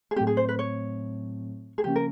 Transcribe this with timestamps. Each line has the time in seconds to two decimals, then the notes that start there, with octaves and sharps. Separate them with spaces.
0.11 G#4
0.16 A2 F#3 A3 C4 G4
0.27 G#4
0.37 C5
0.49 B4
0.59 C#5
1.78 G#4
1.84 C#3 F3 A#3 C#4 G4
1.96 A#4